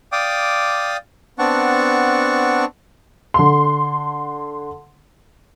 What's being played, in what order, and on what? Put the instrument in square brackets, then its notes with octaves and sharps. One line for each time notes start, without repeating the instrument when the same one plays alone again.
[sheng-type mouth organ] D5 F5 G5 D6 D#6
B3 C4 D4 F#5 A5 C#6
[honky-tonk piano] D3 C6